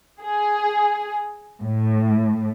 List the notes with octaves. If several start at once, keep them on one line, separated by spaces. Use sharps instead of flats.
G#4
A2